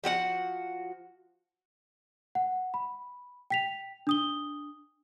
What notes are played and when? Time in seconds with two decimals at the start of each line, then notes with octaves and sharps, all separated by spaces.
0.04 F3 F#4 A4 F#5
2.35 F#5
2.74 B5
3.50 G5 B6 F7
4.07 D4 D#6 G7